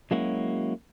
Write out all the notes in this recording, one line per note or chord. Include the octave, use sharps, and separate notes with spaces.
F#3 G#3 A#3 C#4 E4 F#4